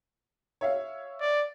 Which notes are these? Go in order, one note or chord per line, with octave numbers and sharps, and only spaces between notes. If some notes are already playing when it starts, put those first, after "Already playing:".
C#5 E5 F5
D5